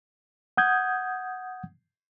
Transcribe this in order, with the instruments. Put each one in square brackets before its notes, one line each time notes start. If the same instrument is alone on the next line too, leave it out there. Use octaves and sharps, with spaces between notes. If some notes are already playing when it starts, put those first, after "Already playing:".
[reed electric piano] F#5 D#6 G6 G#6